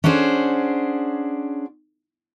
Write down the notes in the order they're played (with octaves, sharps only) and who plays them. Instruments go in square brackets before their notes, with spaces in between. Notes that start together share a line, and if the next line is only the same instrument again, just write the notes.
[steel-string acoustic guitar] C#4 D4 F#4 G#4 C5